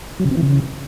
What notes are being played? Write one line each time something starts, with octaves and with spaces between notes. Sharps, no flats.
F#3
C#3
C4
E3
C#3